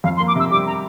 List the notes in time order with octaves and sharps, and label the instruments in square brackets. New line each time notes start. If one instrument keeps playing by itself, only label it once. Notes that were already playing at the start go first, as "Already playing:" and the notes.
[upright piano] F2 [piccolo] F5
[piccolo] C6
[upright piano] A#3
[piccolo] D6
[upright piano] C3 [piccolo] E6
[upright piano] G3 [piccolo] D6
[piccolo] A#5